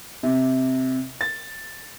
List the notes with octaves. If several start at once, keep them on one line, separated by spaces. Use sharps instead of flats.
C3
A6